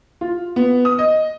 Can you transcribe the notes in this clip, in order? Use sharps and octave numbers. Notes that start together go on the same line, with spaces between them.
F4
B3
D#6
D#5